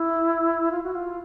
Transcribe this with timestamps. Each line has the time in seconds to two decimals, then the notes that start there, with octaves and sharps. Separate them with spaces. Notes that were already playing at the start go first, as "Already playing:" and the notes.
Already playing: E4
0.72 F4
0.84 F#4
0.95 F4